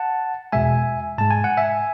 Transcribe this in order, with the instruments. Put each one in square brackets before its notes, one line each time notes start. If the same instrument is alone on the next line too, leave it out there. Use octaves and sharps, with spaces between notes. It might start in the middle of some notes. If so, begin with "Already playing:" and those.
Already playing: [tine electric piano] F#5 A5
E2 B2 G#3 E5 G#5
G#2 G#3 A5
G#5
F#5
E5 G#5